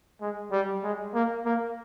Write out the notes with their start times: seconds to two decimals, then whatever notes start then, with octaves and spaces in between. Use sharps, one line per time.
0.21 G#3
0.52 G3
0.83 G#3
1.14 A#3
1.45 A#3